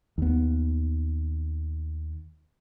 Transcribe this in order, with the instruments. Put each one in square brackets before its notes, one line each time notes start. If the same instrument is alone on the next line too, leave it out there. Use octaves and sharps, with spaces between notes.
[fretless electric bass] D#2 B3